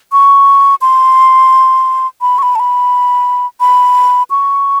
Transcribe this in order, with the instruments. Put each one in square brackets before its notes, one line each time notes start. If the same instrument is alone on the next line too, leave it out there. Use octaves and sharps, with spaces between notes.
[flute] C#6
C6
B5
C#6
B5
A5
B5
B5
C#6